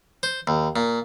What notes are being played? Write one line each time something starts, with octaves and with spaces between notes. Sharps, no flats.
C5
D#2
A#2